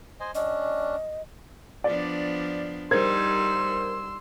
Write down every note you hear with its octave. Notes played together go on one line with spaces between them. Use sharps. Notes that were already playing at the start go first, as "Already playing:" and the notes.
C5 D#5 G#5
G3 C#4 D4 D#5
F3 B3 D4 D5
G3 D#4 A#4 C5 C6 E6 G#6